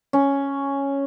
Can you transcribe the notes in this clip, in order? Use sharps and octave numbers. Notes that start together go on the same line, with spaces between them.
C#4